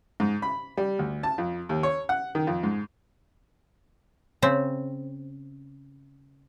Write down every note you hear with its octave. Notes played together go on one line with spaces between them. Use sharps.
G#2
B5
G3
D2
A5
F2
D#2
C#5
F#5
D#3
F2
G#2
C#3 C4